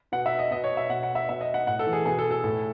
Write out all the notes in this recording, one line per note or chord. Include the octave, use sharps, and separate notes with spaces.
B2 F#5
E5
D#5
B2 D#5
C#5
E5
B2 F#5
F#5
E5
B2 E5
D#5
F#5
A2 F#5
A4
E3
G#4
B2 G#4
A4
A4
A2